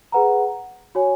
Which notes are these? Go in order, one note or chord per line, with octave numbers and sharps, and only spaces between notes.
G#4 B4 F#5 A#5
F#4 C#5 G#5